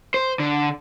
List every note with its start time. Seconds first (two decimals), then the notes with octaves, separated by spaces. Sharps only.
0.14 C5
0.40 D3